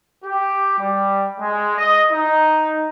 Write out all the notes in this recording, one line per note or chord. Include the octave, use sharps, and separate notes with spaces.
G4
G3
G#3
D#5
D#4